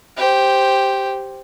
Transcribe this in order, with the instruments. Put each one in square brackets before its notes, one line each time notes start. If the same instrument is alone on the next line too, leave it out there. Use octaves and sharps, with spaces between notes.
[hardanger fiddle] G4 C5